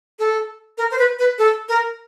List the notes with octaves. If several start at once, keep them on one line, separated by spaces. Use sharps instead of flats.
A4
A#4
C5
B4
B4
A4
A#4